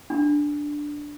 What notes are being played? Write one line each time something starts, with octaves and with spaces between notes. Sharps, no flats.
D4